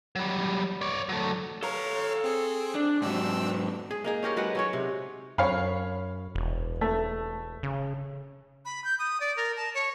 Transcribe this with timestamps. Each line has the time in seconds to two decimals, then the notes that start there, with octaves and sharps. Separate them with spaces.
0.16 F#3 G3
0.81 C#5 D5
1.09 F#3 A3
1.63 A4 C#5 F5 A#5
2.24 C4 G#4
2.75 D4
3.02 G#2 F#3 C4 D4 E6
3.91 G#4
4.04 A#3 D#4 G#4
4.23 C#4 G4 A#4 C#5
4.36 F#3 G#3 B4 F#5
4.55 F#3 C#4 C#5
4.73 C3
5.38 F#2 C#5 F5 B5
6.35 E1
6.81 A3
7.63 C#3
8.65 B5
8.84 G6
8.99 D#6
9.20 D5
9.36 A#4
9.57 A5
9.74 C#5